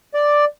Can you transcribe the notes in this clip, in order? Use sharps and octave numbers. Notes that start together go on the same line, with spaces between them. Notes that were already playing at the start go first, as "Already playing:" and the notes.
D5